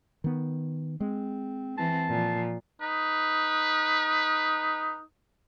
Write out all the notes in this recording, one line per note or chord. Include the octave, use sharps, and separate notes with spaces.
D#3 B3
G#3 C4
E3 C4 A5
A#2 F3
D#4 B4